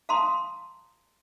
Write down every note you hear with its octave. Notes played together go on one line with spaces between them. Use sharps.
F5 A5 A#5 C6 D#6